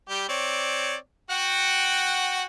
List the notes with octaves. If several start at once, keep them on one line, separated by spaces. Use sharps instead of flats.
G3 G4
C4 C#5 D5
F#4 F#5 G5